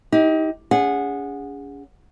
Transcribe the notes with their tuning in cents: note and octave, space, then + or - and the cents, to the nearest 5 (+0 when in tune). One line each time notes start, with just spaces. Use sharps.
D#4 +30 G4 -5
C#4 +40 G#4 -20 F#5 -20